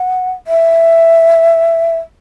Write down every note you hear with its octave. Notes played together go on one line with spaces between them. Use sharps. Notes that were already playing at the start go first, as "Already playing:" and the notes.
Already playing: F#5
E5